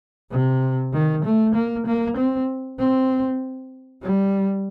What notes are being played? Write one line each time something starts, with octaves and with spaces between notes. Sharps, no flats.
C3
D#3
A3
A#3
A#3
C4
C4
G3